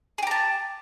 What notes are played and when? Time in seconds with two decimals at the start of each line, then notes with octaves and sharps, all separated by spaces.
0.18 G#4
0.23 G4
0.27 A#5
0.31 A5